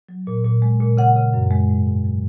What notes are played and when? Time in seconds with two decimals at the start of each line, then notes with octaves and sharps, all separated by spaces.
0.09 F#3
0.27 A#2
0.45 A#2
0.62 G#3
0.81 A#2
0.97 C#3 F#5
1.16 C#3
1.33 F#2
1.51 G#3
1.69 G#2
1.87 G#2
2.04 F#3